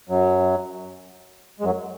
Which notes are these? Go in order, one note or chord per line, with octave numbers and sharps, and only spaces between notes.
F#2 F#3
G#3
F#2 F#3